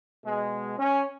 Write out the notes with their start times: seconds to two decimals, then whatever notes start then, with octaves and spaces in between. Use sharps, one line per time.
0.25 B2 G#3
0.79 C#4